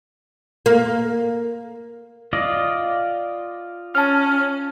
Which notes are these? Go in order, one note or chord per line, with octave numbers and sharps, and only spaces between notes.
A#3
F4 D5 D#5
C#4 A5 F6